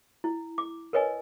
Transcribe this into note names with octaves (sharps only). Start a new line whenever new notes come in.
E4
D6
A#4 B4 C#5 D#5 G#5